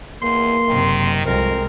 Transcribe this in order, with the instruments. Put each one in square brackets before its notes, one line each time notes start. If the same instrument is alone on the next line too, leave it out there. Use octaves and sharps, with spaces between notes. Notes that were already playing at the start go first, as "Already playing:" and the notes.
[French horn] E2 [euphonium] A#3 [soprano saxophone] C6
[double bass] F#1 C3 [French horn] D#3
[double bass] C2 G#3 [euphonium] F2 [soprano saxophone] C4 [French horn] A#4